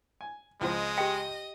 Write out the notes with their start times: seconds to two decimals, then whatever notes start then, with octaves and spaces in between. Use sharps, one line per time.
0.21 G#5
0.61 C#2 F3 G#3 C4 D#5
0.98 G4 G5